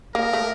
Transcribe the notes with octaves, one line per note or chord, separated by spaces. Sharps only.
A#3 A#4
A3